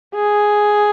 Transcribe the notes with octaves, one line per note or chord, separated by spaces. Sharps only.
G#4